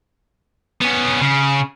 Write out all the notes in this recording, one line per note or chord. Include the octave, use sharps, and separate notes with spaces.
B3 C#4
C#3